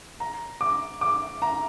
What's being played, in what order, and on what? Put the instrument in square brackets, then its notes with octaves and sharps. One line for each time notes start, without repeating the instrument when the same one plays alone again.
[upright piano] A#5
D6
D6
A#5